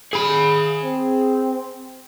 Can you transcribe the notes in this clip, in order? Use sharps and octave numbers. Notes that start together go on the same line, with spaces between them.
G#4 B5
C4